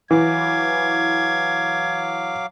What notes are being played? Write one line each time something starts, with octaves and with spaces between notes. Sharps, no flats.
E3 F#3 F5 D6 G#6